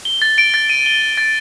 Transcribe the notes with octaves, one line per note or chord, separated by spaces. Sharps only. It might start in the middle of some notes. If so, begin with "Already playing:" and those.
G7
A6
D7
A6
D#7
G7
G7
A6